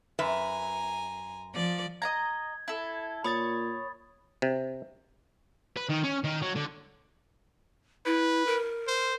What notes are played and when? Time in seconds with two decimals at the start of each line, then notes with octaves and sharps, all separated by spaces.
0.19 F#2 B4 E5 G#5 A#5
1.52 F3 D5
2.02 D#5 F#5 A#5 G#6
2.68 E4 A4
3.24 A#2 C#5 B5 D#6 A6
4.42 C3
5.76 B4
5.89 D#3
6.03 C#4
6.24 D#3
6.42 F#3
6.55 D3
8.06 E4 B4
8.47 A#4
8.87 C5